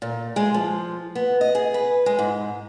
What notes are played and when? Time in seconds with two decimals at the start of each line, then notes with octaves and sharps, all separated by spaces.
0.02 A#2
0.36 G#3
0.54 F3
1.15 B3
1.41 D#5
1.55 G#4
1.74 B4
2.06 G#3
2.19 G#2